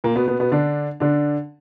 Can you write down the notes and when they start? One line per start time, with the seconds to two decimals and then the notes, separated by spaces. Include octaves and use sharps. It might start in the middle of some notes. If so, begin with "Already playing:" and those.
0.04 A#2 A#3
0.16 B2 B3
0.27 B2 B3
0.40 B2 B3
0.52 D3 D4
1.00 D3 D4